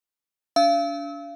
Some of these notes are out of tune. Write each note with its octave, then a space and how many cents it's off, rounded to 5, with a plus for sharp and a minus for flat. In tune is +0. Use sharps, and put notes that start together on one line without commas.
D4 -35 F5 -35 E6 -30